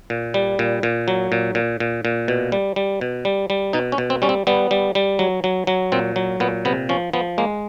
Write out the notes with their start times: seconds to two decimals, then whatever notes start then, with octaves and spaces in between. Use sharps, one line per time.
0.10 A#2
0.34 G3
0.59 A#2
0.83 A#2
1.08 F#3
1.32 A#2
1.55 A#2
1.80 A#2
2.05 A#2
2.28 B2
2.52 G3
2.76 G3
3.01 B2
3.25 G3
3.50 G3
3.73 B2 D#4
3.92 C#4
3.98 B2
4.10 C4
4.22 G3 C#4
4.29 C4
4.47 G3 B3
4.71 G3
4.95 G3
5.19 F#3
5.44 F#3
5.67 F#3
5.92 A#2 C4
6.16 F#3
6.40 A#2 B3
6.65 C3 B3
6.89 F3 C#4
7.13 F3 B3
7.38 G#3 A#3